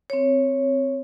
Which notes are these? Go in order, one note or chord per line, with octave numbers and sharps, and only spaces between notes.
C4 C#5